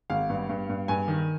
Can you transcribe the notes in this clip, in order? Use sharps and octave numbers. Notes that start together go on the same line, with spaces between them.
G#1 F5
G2
G2
G2
G2 G#5
D#3